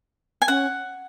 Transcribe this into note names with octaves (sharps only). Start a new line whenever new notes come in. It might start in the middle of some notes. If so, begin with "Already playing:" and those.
G#5
C#4 F#5